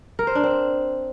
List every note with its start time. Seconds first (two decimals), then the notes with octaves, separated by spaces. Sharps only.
0.19 A#4
0.27 C5
0.35 D4
0.44 C4